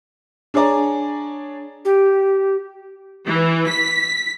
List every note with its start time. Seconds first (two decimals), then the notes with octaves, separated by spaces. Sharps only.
0.54 D4 G#4 C#5 D5 A#5
1.85 G4
3.26 E3
3.69 B6